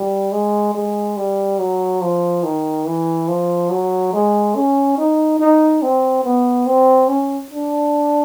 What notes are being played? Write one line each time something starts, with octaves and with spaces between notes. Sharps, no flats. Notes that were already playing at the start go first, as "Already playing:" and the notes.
Already playing: G3
G#3
G#3
G3
F#3
F3
D#3
E3
F3
F#3
G#3
C#4
D#4
D#4
C4
B3
C4
C#4
D4